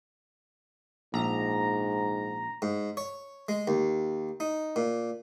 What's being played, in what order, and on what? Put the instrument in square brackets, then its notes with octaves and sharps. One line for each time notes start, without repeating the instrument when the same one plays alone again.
[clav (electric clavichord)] A#1 [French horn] G#2 [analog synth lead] A#5
[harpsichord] G#2
C#5
G#3
D#2
D#4
A#2